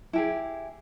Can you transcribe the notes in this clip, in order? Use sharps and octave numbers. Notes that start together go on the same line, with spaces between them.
E4 G4 G#4